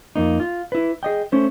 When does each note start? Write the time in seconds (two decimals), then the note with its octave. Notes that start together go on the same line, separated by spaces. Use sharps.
0.16 F2 A#3 D#4
0.40 F4
0.72 E4 B4
1.03 G#4 D#5 G5
1.32 A3 C#4 C5